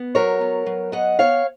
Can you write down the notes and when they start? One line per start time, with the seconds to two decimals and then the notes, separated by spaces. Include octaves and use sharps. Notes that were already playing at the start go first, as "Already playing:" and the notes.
Already playing: B3
0.15 F#3 A#4 C#5
0.41 B3
0.66 F#3
0.92 B3 D#5 F#5
1.19 B3 C#5 F5